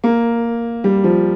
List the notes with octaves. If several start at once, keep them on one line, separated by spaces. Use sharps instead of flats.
A#3
G3
F3